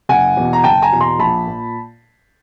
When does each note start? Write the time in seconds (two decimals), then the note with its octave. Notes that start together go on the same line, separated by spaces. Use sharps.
0.09 F#1 F#5 G#5
0.37 E2 B2
0.53 A#5
0.64 F#1 G5 A5
0.82 G#5 A#5
0.92 E2 B2
1.01 A#5 C6
1.19 A#1 A5 B5
1.47 A#2